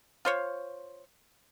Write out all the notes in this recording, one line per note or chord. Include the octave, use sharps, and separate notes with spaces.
F4 C5 C#5